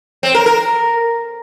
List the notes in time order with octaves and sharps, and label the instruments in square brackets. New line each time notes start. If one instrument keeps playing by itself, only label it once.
[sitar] C4
A#4
A#4